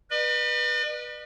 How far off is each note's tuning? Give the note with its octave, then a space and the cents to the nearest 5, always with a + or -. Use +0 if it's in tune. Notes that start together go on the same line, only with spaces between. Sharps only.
B4 -20 D5 +45